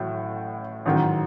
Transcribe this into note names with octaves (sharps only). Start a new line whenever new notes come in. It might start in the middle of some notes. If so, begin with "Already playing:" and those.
Already playing: A1 A2 F#3
A1 G#2 D#3 F#3